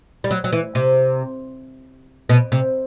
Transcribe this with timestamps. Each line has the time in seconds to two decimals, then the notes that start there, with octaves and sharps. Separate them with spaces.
0.24 G3
0.31 F#3
0.44 F#3
0.53 E3
0.75 C3
2.29 B2
2.52 C3